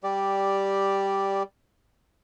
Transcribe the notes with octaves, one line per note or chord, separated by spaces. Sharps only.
G3 G4 D5